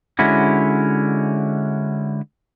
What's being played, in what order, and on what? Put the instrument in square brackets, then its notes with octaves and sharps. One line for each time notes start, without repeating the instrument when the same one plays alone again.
[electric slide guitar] D3 G#3 C#4 E4 F#4